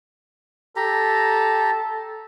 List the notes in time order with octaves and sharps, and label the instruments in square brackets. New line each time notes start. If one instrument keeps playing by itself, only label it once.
[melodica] G4 A#5 [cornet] A4